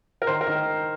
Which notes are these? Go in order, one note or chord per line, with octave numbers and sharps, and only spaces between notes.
A#4
D#3 C5
A#4
D#3